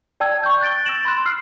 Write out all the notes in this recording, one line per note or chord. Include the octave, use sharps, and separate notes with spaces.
D5 G5 A5 E6 G#6
C#6 G6
F#6 A6 D7 G7
E6 A6 A#6 D7 E7 F#7
B5 C6 F#6
E6 F6 C7